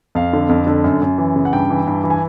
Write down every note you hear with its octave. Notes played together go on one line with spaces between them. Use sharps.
F2 F5
D3
F2
D3
F#2
F#2
E3
C#3
F#5
G2 G5
E3
G2
E3
G#5